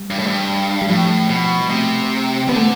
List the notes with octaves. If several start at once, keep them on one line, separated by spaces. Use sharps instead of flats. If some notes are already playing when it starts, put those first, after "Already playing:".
Already playing: G3
G2
A2
G2
G3
A2 F3
B2
G3
C3 A3
D3 B3
A3